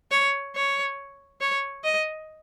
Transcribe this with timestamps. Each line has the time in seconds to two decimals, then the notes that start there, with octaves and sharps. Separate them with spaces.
0.11 C#5
0.55 C#5
1.41 C#5
1.84 D#5